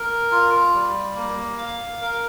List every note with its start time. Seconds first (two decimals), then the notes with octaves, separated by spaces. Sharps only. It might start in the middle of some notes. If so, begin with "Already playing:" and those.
Already playing: A#4
0.31 F4
0.74 G3
1.16 A#3
1.58 F5
2.01 A#4